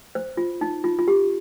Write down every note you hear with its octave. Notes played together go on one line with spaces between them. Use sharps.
C5
F4
D#4
F4
F4
G4